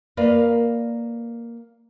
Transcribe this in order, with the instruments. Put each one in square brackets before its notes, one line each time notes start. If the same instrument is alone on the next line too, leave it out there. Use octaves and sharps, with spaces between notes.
[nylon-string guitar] A#3 A#4 B4 D5 F5